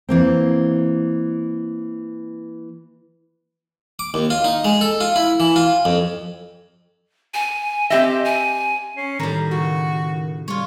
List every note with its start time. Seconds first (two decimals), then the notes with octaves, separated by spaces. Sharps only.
0.09 E3 A#3 C4
3.99 D6
4.14 D#2
4.30 F4
4.44 D#4
4.65 G#3
4.81 A4
5.01 F4
5.16 E4
5.40 E3
5.56 F4
5.85 F2
7.34 G#5
7.90 C4 G4 D#5 E5
8.25 G#5
8.97 C#4 C7
9.20 A2 D#3 G3 A#5
9.51 C#3 F#4
10.48 G3 F4 C#5